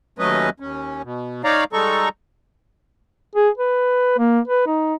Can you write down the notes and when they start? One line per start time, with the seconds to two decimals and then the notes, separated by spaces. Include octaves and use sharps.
0.19 D#2 F#3 A3 C#4 B4 D#5
0.60 D#2 C#4
1.04 B2
1.44 D#4 C#5 D5 F5 A#5
1.73 G3 G#3 D#4 A4 A#5 C#6
3.35 G#4
3.58 B4
4.18 A#3
4.48 B4
4.67 D#4